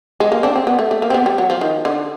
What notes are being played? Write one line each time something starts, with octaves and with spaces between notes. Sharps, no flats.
G#3
A#3
C4 D4
C4
B3
A3
A3
A#3
C4
B3
G3
F#3
F3
D#3
D3